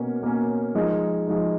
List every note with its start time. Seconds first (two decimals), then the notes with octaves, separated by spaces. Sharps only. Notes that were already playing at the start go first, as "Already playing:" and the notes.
Already playing: B2 A#3 C#4
0.22 B2 A#3 C#4
0.75 F3 G#3 D#4
1.27 F3 G#3 D#4